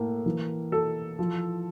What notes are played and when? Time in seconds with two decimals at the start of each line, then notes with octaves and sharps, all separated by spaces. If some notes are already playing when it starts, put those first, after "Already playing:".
Already playing: A2 A#3
0.26 E3
0.72 A4
1.19 F3